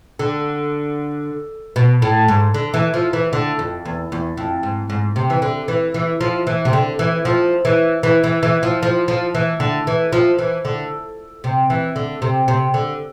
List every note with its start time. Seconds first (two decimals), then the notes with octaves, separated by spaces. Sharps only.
0.19 D3
1.76 B2
2.02 A2
2.28 G#2
2.54 D3
2.74 E3
2.94 F3
3.13 E3
3.33 D3
3.59 F2
3.85 E2
4.12 E2
4.37 F2
4.63 G#2
4.90 G#2
5.16 C3
5.30 E3
5.42 D3
5.68 E3
5.94 E3
6.21 F3
6.47 E3
6.65 C3
6.73 D3
6.99 E3
7.25 F3
7.65 E3
8.03 E3
8.24 E3
8.43 E3
8.63 F3
8.83 F3
9.08 F3
9.35 E3
9.60 D3
9.87 E3
10.12 F3
10.38 E3
10.65 D3
11.44 C3
11.70 E3
11.96 D3
12.22 C3
12.48 C3
12.74 D3